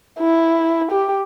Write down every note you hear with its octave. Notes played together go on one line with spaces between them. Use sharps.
E4
G4